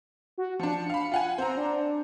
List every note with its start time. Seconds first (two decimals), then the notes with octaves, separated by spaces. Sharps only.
0.38 F#4
0.59 F3 D4 C#7
0.90 F5 B5
1.11 F4 F#5 G#5
1.38 C4 C5 A#5
1.57 D4